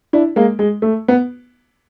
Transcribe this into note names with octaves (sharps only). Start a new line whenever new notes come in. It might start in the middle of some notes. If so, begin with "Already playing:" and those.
D4 E4
G#3 A#3
G#3
A3
B3